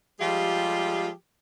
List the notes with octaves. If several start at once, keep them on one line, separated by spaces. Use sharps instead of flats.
F3 G3 G#3 F4 G4 G#4